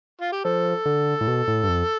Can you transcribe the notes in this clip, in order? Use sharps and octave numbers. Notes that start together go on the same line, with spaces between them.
F4
G4
F3 A4
D3
A2
B2
A2
G2
F2